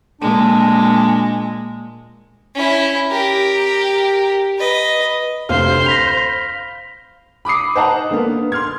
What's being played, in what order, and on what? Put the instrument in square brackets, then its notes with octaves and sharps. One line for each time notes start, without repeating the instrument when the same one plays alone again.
[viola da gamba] A#2 G#3 [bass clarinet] D4
[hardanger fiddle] C#4 E4
G4 A#4
B4 D#5
[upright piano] F1 D2 [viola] C5 [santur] F5
[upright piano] B5 [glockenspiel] A#6 B6 F7
[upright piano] B5 D6 D#6 C7
C5 D#5 F#5 A5 A#5
D3 A#3 B3
C6 F6 G#6